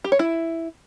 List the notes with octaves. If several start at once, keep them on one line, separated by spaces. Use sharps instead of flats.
G4
C#5
E4